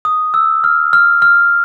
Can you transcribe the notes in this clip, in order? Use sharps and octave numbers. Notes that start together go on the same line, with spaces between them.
D#6
E6
F6
F6
F6